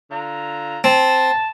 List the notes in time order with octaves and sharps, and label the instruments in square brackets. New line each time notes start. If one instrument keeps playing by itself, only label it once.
[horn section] D3 F4 A#5
[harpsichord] C4 [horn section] A5